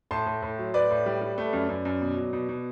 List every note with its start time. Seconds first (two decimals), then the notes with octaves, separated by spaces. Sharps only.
0.11 A2 A5 C6
0.26 A2
0.42 A2
0.59 F#3
0.74 A2 B4 D5
0.91 A2
1.06 G3
1.21 G3
1.38 A3
1.53 F#2
1.69 F#2
1.85 F#2
2.01 B2
2.17 F#3
2.33 B2
2.49 B2